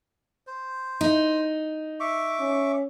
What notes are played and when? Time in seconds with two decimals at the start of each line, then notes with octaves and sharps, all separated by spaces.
0.47 C5
1.01 D#4
2.00 E5 C#6 D6
2.41 C#4